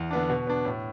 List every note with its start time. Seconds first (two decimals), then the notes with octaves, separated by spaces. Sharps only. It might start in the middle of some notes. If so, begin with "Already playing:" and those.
Already playing: E2
0.11 D3 B3 D4
0.30 B2
0.47 B3 D4
0.65 A2